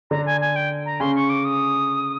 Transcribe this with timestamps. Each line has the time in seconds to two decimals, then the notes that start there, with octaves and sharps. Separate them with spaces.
0.11 D3 D4 A#5
0.26 G#5
0.41 G#5
0.56 G5
0.86 A#5
1.00 C#3 C#4 C6
1.15 C#6
1.30 D6
1.45 D#6